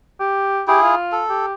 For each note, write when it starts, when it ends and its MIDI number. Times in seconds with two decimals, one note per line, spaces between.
0.20 0.62 67
0.68 0.95 64
0.68 0.80 67
0.68 0.95 68
0.82 1.22 65
1.12 1.46 69
1.30 1.54 67